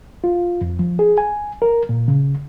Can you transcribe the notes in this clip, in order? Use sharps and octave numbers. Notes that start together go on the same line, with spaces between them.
F4
F2
F3
G#4
G#5
A#4
A#2
C#3